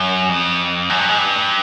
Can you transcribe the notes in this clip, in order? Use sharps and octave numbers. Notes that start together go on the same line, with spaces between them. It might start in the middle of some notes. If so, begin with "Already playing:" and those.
Already playing: F#2
F2
F#2
G2
G#2
G2